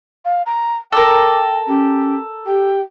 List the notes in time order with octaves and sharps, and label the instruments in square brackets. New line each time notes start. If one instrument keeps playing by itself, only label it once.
[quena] F5
A#5
[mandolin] A4 A#4 [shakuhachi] G5 [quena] D6
[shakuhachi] C#4 [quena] G4
[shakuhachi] G4 [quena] G5